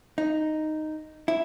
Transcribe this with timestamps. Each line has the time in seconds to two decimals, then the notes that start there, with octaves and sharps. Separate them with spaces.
0.18 D#4
1.28 E4